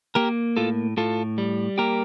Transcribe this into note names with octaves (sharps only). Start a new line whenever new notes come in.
A#3 G4 A#4
A2 F4 A4
A2 F4 A4
G3
A#3 G4 A#4